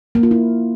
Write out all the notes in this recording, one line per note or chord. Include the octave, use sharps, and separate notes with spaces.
A#3
F4
E4